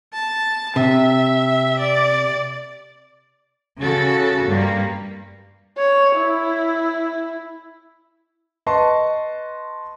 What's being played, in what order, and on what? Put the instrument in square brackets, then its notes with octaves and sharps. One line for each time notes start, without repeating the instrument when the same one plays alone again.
[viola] A5
[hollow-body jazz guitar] C3 [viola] E5
[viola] D5
[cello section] C#3 F#4 A4
G2 G3 A#3
[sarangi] C#5
E4
[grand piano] B4 D#5 A5 C6 C#6